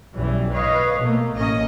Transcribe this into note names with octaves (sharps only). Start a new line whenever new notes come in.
B1 F#2 E3 G3
B4 C#5 D#5 F5
B2 A3 A#3
A1 A#3 C#4 D#5